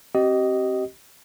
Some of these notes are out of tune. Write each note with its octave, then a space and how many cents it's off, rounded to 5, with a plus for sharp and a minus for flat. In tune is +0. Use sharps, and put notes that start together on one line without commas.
C4 +30 G4 -30 D#5 +0